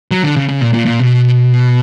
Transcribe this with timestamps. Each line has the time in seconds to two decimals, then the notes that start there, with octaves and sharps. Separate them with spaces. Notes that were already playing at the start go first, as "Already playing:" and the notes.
0.11 F#3
0.23 D3
0.36 C#3
0.49 C#3
0.61 A#2
0.73 A#2
0.86 A#2
1.00 B2